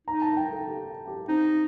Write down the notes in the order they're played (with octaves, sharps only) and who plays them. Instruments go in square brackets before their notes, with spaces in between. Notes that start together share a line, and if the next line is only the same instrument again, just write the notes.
[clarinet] D#4 [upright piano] A#5
[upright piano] A5
G5
A4
G4
G4
[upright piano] C4 [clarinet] D#4